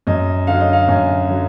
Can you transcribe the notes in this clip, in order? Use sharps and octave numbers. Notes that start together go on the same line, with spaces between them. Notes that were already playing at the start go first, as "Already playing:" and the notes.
F#2 D#5
D3 F#3 F5
D#5
F5
F#2 G#5
D3 F#3